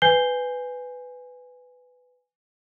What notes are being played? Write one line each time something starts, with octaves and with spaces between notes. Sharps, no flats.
B4 G#5 G6 C7 G7